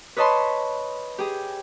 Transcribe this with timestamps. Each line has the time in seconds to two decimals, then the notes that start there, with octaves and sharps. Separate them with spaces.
0.17 B4 C#5 D#5 A5 B5 C6
1.18 G4 G#4